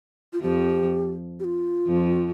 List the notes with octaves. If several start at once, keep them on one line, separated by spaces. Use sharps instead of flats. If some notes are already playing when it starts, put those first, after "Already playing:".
F4
F2 F3 G4
G4
F4
F2 F3